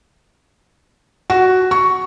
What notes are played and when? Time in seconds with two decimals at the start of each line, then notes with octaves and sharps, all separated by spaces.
1.30 F#4
1.71 C#6